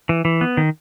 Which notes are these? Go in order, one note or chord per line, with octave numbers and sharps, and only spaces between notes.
E3
E3
B3
D#3